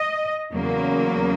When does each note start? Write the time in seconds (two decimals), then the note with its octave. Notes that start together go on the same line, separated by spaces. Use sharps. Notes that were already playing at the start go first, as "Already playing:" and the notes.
Already playing: D#5
0.52 E2 C#3 F#3 A#3